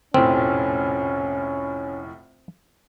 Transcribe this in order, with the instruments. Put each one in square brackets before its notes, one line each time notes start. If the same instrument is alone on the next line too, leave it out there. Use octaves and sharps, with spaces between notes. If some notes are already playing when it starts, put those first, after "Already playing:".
[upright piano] F1 A#1 A2 [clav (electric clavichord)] C4 [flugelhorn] C#4